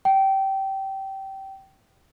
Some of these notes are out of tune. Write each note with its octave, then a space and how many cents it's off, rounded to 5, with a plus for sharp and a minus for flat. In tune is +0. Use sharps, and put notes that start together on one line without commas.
G5 -20